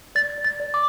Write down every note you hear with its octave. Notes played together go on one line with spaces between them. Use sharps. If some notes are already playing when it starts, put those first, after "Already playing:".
D5 A6
D5
A6
D5
D6